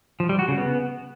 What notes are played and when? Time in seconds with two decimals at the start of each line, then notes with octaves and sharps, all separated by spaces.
0.20 F3
0.29 G3
0.39 F#4
0.48 C#3
0.58 B3